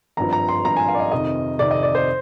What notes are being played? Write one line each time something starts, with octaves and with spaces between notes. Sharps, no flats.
G#1 G2 F3 A#5
A#5
C6
G#1 G2 F3 A#5
G#5
F5
D5
D#5
F2 C3 D#3 D#5
F2 C3 D#3 D5
D#5
D5
C5